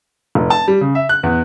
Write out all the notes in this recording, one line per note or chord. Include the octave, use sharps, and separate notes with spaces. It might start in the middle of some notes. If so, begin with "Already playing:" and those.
F1
A5
G3
C#3
E5
F#6
E2